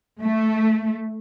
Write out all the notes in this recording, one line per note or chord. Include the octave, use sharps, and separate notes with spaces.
A3